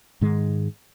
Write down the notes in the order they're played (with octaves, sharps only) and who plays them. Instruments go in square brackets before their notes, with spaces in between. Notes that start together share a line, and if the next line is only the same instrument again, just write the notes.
[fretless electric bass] G#2 D#3 G#3